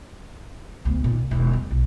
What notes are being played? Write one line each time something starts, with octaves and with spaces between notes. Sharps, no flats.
D2 B3
A#2 D#3
C2
E1 D#3
G3
B1